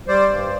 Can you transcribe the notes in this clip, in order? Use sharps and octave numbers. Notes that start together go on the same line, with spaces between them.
G3 C5 D5
G2